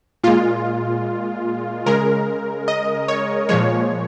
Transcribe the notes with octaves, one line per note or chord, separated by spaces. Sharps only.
A#2 G#3 F4
C#3 G#3 A#4
D#5
C#5
A#2 F3 G#3 C#5